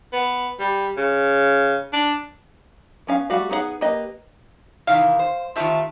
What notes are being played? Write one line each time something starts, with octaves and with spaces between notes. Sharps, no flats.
B3
G3
C#3
D4
B3 C#4 F5
G3 A3 F#4 F5
B3 D#4 G#4 C#5 F#5
A#3 G4 B4 D#5
C3 D#3 E3 F5
C5
C3 D#3 A3 F4 E5